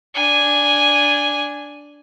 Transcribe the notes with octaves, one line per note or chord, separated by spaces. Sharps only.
D4 G#5